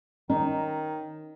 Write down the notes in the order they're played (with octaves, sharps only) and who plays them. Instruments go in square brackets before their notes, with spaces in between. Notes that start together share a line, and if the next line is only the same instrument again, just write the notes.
[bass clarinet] D#3 [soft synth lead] C#4 [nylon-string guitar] D#4